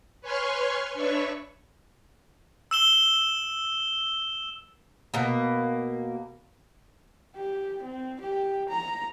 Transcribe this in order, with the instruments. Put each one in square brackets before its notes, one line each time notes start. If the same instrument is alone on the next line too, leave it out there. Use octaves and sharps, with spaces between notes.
[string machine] B4 C#5 G#5 C6 C#6 F6
D4 B4 C#5 E5 C#6
[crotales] E6 E7 G7
[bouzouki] B2 A#3
[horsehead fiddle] G4
C4
G4
A#5